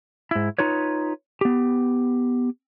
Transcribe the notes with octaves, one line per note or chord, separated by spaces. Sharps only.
G#2 E4
D#4 F4 B4 C#5
B3 G4